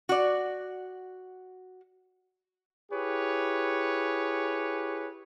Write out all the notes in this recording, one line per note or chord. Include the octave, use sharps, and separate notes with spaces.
F#4 D5
E4 G4 G#4 B4 C#5